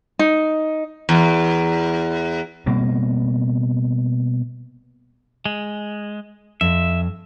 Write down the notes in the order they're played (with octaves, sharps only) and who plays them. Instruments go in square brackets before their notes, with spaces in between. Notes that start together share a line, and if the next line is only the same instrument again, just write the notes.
[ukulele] D#4
[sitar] E2
[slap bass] B2 G3 A#3 C4
[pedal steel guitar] G#3
[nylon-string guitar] F2 [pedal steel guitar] E5